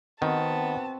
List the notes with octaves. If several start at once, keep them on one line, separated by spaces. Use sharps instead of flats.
D#3 B3 C4 F#4 A5